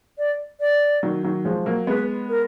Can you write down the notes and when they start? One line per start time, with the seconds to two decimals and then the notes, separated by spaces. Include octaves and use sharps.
0.18 D5
0.60 D5
1.03 D#3 F#3
1.23 D#3 F#3
1.45 F3 G#3
1.66 F#3 A#3
1.87 G#3 B3 B4
2.29 A#4